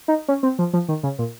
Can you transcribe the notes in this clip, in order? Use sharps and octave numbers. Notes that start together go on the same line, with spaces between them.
D#4
C#4
C4
F3
F3
D#3
C#3
A#2